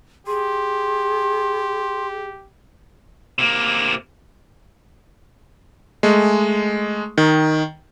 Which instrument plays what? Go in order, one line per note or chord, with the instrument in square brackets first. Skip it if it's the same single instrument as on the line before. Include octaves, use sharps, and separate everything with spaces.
[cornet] G4 [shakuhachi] G#4 [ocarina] C6
[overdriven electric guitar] C3 A#3
[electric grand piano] G#3 A3
D#3